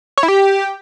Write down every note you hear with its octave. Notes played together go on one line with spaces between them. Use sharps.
C#5
E4
G4